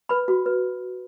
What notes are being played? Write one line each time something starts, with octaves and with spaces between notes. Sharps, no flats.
B4 B5
F#4
B4